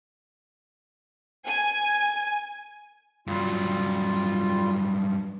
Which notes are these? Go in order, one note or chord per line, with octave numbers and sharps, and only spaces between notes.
G#5
G2 F#3 G3 F4